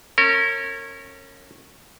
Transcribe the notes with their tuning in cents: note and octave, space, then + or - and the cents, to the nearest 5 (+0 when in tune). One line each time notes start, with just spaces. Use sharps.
C#4 -20 A#4 -35